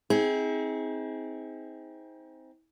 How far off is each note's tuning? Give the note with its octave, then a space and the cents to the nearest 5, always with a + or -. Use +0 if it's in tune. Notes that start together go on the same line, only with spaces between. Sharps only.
C4 -5 D#4 +40 G#4 +0